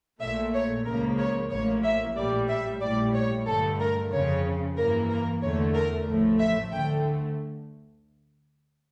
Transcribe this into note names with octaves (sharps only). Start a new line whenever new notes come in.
A#1 A#2 A3 E5
C#5
C#2 C#3 F3 A#3 A#4
C#5
A1 A2 F3 A#3 C#5
E5
A#1 A2 G3 D5
E5
A#1 A2 G3 D5
C#5
G2 D3 A3 A4
A#4
F2 C#3 F3 C#5
G2 E3 A#3 A#4
A#4
E2 D3 A3 C#5
A#4
A1 A2 F3 A3
E5
D2 D3 A3 G5